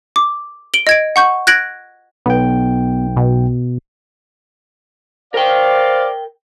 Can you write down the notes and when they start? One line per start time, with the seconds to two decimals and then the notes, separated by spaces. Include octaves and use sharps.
0.16 D6
0.74 D7 F#7 G7
0.87 D#5 G#6 D7
1.16 F#5 C#6 G6
1.47 F#6 G#6 A#6 D7 F#7
2.26 B1 B3 G5
3.17 B2
5.34 A#4 C5 D5 F5 G5